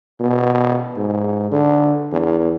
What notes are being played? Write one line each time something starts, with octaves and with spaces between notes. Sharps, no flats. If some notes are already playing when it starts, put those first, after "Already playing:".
B2
G#2
D3
E2